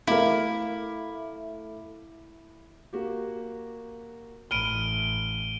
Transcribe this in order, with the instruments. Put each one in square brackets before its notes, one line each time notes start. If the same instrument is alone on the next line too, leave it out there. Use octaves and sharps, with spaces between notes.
[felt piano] A3 D6 [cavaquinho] E4 [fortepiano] A#4 F5
[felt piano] A#3 F#4 G4
[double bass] A1 [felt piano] B5 F6 [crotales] D7 D#7 G7